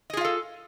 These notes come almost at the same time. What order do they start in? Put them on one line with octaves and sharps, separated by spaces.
D#5 G#4 F4 F5 A4